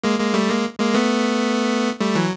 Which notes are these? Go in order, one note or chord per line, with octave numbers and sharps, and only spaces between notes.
G#3 A#3
G#3 A#3
G3 A3
G#3 A#3
G#3 A#3
A3 B3
G3 A3
E3 F#3